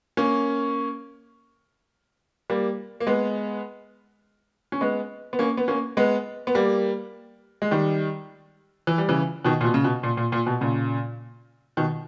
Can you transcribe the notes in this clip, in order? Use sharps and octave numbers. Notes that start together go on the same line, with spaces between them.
A#3 C#4
G3 A#3
A#3
G#3 B3
C#4
G#3 B3
B3
A#3 C#4
B3
A#3 C#4
G#3 B3
B3
G3 A#3
G#3
D#3 G3
E3
G3
C#3 E3
B2 D#3
A#2
B2
C#3
B2
A#2
A#2
A#2
B2
A#2 C#3
B2 D#3